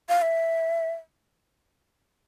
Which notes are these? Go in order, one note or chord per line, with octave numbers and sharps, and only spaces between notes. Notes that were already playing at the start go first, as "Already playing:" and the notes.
F5
E5